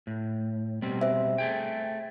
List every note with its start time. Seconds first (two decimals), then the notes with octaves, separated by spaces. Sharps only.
0.07 A2
0.82 B2 G3 C4
1.01 C5 E5
1.38 A3 G#4 G5